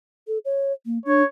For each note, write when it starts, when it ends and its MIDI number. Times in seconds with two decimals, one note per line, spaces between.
0.28 0.38 69
0.45 0.72 73
0.86 0.98 58
1.06 1.22 62
1.06 1.25 73